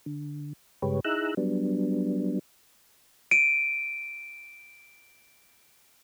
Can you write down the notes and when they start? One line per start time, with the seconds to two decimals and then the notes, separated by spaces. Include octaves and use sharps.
0.06 D3
0.82 G2 C#3 G#3 G4 B4 C#5
1.05 D#4 E4 G#4 A#5 E6 F#6
1.37 F#3 G3 B3 D4
3.31 D7 D#7